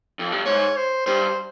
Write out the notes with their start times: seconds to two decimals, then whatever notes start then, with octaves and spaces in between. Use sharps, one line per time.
0.19 F2
0.32 G2
0.45 G#2 C#5
0.76 C5
1.06 G2 C5